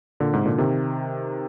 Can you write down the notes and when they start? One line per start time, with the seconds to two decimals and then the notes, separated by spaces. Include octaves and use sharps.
0.20 A#2 D3
0.33 G#2 C3
0.46 A#2 D3
0.58 C3 D#3